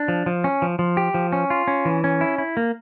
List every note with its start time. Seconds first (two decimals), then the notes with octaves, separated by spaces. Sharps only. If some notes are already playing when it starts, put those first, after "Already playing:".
Already playing: D4
0.08 F3
0.26 F3
0.44 C#4
0.62 F3
0.79 F3
0.97 G4
1.14 F3
1.32 C#4
1.50 F4
1.68 C#4
1.85 E3
2.04 C#4
2.21 E4
2.38 E4
2.57 A#3